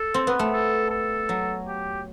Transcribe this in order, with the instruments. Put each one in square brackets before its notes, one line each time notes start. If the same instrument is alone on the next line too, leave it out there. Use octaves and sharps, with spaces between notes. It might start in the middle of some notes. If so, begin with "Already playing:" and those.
Already playing: [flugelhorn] A4
[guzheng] C4
B3
A3
[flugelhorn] A4
A4
[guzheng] F#3
[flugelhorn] G4